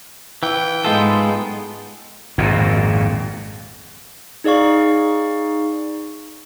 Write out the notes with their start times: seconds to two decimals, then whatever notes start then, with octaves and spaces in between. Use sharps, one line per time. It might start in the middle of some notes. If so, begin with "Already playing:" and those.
0.43 E3 G5
0.84 G#2 G#3 B3 F4 A4
2.38 G#1 F2 A#2
4.44 D#4 G#4 D5 F5 C#6